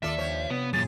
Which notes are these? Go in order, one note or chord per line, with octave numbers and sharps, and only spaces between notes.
D#2 D#3 F4 A4 D5 E5
G2 F3 C#5
C3 B3
F#2 A#2 G#4 A6